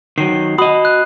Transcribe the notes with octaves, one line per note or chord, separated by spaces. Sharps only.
D#3 F#3 C7
F#4 D#5 B5 D#6
F#6